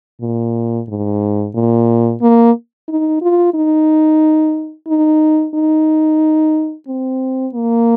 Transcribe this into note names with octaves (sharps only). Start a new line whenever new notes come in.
A#2
G#2
A#2
A#3
D#4
F4
D#4
D#4
D#4
C4
A#3